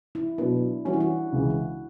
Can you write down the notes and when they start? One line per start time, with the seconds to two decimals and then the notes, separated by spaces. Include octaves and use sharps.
0.15 E4
0.38 B2 F#3 B3 D4
0.85 E3 G3 C#4 F#4
0.93 E4
1.00 F#4
1.32 C#2 C#3 E3